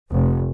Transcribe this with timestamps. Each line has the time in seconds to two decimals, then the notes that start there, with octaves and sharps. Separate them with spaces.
0.11 F1